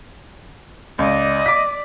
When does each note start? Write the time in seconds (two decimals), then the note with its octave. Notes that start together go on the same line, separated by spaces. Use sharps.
0.99 C#2 D5 D#5
1.46 D6 B6